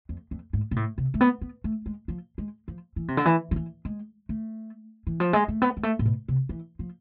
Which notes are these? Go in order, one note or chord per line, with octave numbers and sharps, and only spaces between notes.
F2
F2
G#2
B2
A2
C3
A3
B3
B3
A3
G#3
F3
G#3
F3
E3
C3
D3
E3
F3
E3
G#3
A3
E3
F3
G#3
A3
B3
G#3
A3
A2
B2
C3
E3
F3